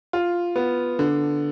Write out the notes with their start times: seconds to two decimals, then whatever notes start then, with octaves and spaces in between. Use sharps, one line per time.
0.13 F4
0.56 B3
0.99 D3